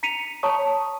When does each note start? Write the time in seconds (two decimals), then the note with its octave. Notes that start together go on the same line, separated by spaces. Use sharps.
0.03 A#5 B6 C#7 D#7 F7
0.43 C#5 A5 A#5 C#6 D#6